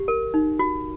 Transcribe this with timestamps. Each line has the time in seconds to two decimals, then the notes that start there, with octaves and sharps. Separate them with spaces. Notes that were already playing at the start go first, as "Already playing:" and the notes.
Already playing: G4
0.08 A#4
0.34 D#4
0.59 F#4